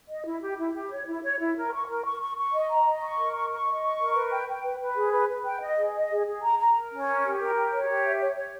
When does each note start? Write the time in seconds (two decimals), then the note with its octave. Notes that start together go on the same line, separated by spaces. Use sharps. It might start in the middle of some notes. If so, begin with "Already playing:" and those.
0.10 D#5
0.25 E4
0.42 G4
0.58 E4
0.74 G4
0.91 C#5
1.07 E4
1.23 C#5
1.39 E4
1.56 A#4
1.72 C#6
1.88 A#4
2.04 C#6
2.20 C#6
2.37 C#6
2.52 D#5
2.69 A#5
2.85 D#5
3.01 C#6
3.17 A#4
3.34 C#6
3.50 C#6
3.66 D#5
3.83 C#6
3.99 A#4
4.15 B4
4.32 G5
4.47 G5
4.64 B4
4.80 B4
4.95 G#4
5.12 B4
5.29 B4
5.44 G5
5.61 D#5
5.78 G#4
5.94 D#5
6.10 G#4
6.26 G#4
6.42 A#5
6.59 A#5
6.74 A#4
6.91 C#4
7.07 A#4
7.23 G4
7.39 A#4
7.55 G4
7.72 C#5
7.88 G4
8.05 E5
8.20 C#5
8.37 C#5